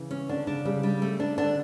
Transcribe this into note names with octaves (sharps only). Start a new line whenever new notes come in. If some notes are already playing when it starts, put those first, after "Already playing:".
Already playing: C#3 E3
C#4
D3 D4
C#3 D4
C#3 G3
G3
A3
D4
D3 D4